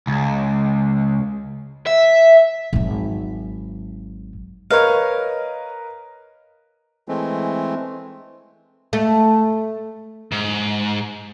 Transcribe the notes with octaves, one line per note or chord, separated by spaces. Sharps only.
C#2
E5
G#1 F#3
A#4 B4 C#5 D#5 F5
E3 G#3 A3 C4
A3
G#2